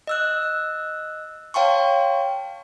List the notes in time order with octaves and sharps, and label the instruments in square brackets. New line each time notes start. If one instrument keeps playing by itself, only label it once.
[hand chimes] D#5 E6 F#6
C#5 F5 G5 A5 C6 C#6